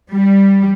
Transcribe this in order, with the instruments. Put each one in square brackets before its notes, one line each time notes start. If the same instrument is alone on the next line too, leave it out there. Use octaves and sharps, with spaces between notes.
[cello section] G3